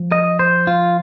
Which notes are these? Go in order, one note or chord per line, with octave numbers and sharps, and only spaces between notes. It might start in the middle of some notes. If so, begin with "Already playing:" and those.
Already playing: F3
D#5
C5
F4